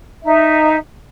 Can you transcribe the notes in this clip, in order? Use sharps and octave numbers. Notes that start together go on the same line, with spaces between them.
D#4 E5